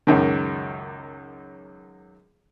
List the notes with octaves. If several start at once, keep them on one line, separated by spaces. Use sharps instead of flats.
C#2 F#2 D#3